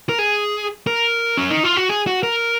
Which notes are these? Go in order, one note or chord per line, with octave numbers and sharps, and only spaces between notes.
A#4
G#4
A#4
C#4
D#4
F4
F#4
G#4
F#4
A#4